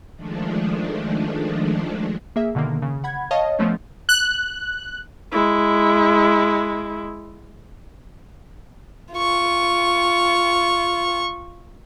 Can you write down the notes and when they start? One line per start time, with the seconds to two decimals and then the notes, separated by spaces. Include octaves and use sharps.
0.16 D#3 F3 G#3 A3 D4
2.36 A#3 G#4 E5
2.55 B2 D3 D#3 A#3
2.82 C#3
3.04 F#5 B5 G#6
3.31 C#5 D#5 F5 A5
3.59 F3 A3 B3 C#4
4.09 F#6
5.31 G#3 E4
9.13 F4 C#6